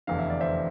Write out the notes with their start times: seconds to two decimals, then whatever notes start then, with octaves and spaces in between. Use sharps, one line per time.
0.07 F1 E2 D3 F5
0.19 E5
0.30 D5
0.41 C5 E5